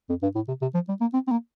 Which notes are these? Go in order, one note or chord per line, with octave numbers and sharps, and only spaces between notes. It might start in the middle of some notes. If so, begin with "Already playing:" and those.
F2
G2
A2
C3
C3
F3
G3
A#3
C4
C4
A#3